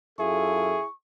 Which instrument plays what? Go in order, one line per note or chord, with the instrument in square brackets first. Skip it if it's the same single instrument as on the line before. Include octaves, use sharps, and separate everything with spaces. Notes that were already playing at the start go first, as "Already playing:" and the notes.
[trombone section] F#2 F4 A4 [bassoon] E4 [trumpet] G#4 [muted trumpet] C#6